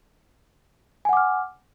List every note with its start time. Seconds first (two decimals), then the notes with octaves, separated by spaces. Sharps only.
1.05 G#5
1.09 F#5
1.13 D6
1.17 F6